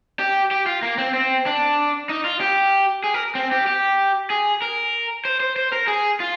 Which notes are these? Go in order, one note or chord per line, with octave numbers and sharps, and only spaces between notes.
G4
G4
F4
A#3
C4
C4
D4
D#4
F4
G4
G#4
A#4
C4
G4
G4
G#4
A#4
C5
C5
C5
A#4
G#4
F4